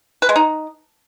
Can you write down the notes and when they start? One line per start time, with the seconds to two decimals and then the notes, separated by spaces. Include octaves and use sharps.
0.22 B4
0.29 G#3
0.36 D#4